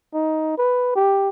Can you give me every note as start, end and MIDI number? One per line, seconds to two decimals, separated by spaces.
0.14 0.57 63
0.58 0.94 71
0.96 1.29 67